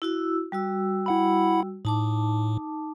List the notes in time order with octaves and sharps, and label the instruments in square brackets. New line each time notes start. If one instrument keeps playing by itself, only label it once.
[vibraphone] E4 F#4 E6
G3 F#4 E6
[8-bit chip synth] E4 F#5 B5
[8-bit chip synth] A2 [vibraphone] D#4 A5 D6